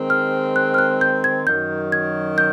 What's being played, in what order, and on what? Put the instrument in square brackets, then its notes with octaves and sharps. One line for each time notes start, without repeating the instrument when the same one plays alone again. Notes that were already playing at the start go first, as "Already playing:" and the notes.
Already playing: [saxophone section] D#3 G#3 C4
[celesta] F6
F#6
F6
F#6
G6
G#6
[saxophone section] F#2 D#3 F#3 [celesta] G6
[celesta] G#6
G6